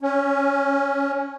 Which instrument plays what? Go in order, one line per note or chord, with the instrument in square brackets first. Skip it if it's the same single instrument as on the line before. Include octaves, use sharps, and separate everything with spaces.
[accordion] C#4